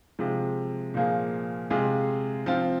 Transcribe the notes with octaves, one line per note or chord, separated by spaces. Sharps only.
C3 F3 G#3
A#2 F3 A#3 G#4
C3 G#3 F4 G#4
F3 C4 F4